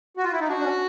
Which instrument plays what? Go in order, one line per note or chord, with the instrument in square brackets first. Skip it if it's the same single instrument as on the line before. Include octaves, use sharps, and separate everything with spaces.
[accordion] F#4
F4
E4
D#4
[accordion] D4 [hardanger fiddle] F#4
[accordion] D4
C#4